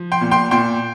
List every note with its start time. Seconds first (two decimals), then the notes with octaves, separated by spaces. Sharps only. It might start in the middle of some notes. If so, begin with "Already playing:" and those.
Already playing: F3
0.12 G5 C6
0.21 A#2
0.31 G5 C6
0.51 A#2 G5 C6